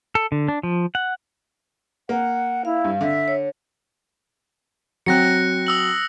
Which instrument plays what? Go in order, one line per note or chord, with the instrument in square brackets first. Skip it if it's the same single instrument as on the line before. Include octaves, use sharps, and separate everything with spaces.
[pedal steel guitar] A4
D3
D4
F3
F#5
[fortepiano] A#3 [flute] F#5
[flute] E4 [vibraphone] F5
[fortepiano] G2
[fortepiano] D3 [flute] E5
[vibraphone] C#5
[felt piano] F#3 C4 [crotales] F#6 A#6 C#7
[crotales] D#6 E6 F#7